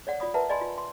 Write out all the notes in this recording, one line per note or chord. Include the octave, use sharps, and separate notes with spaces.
C#5 D5 F#5
F4 D5 B5 D#6
A#4 B4 E5 F#5 A5 A#5
D5 D#5 G#5 B5 C6
F4
C6